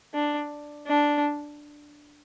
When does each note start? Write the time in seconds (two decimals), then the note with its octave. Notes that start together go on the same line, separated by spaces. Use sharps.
0.14 D4
0.87 D4